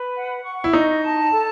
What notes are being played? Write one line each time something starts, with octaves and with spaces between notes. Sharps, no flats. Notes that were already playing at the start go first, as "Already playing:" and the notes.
Already playing: B4
F#5
C#6
E4
D#4 D#5
A5
A4